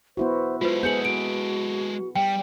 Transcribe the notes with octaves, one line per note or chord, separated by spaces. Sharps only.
B3 E4 F#4 C5
G#3 F4 A4 B4 C5
B3 G#4 G6 C#7 F#7
F#4 D7
G3 G5